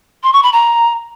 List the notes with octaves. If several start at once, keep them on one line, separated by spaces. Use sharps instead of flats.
C6
C#6
B5
A#5